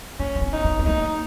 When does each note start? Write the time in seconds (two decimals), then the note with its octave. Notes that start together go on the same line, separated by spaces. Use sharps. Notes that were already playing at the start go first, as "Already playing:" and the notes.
0.19 A#3 C#4
0.35 C4
0.41 B3
0.53 D#4
0.64 B3
0.79 B3
0.86 A#3 D#4